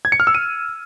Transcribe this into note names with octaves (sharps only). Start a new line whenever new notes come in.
G#6
C#7
F6
E6
D#7